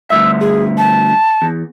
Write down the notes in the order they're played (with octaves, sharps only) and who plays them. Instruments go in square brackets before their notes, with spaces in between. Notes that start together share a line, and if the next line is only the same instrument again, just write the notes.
[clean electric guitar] D2 G2 E5 [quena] E6
[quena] G#4
A5
[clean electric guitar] E2